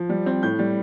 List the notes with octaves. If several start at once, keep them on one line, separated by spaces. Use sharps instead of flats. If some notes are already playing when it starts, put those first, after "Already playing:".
Already playing: F3
G3
C4
A2 G6
G3